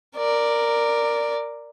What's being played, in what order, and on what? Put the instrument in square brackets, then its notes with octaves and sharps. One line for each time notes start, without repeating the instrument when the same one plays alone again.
[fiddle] A#4 D5